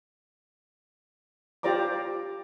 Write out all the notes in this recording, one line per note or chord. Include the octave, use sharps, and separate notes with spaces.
F4 G4 C5 D5 A#5 D6